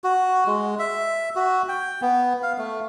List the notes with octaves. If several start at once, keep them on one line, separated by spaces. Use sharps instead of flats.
F#4
G#3
E5
F#4
G5
B3
F5
A3